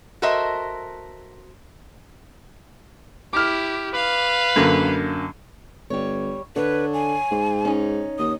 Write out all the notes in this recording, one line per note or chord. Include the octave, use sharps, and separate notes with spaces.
F#4 A4 A#4 C5 D#5 E5
E4 G4 D6 F6
B4 F5
F#2 D3 A#3
G1 G3 C#5
D3 B4 C#5
G#5
G#2
C#4 D#4
D#2 D#6